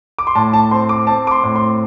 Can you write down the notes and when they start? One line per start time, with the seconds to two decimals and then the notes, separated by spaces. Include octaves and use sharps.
0.19 D6
0.27 C6
0.35 A2 A5
0.53 A5
0.71 C4 C6
0.89 D6
1.07 C4 A5
1.27 D6
1.31 C6
1.43 A2
1.55 C6